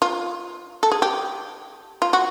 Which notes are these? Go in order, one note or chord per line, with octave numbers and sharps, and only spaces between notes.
F4
A4
G#4
G4
F4
F#4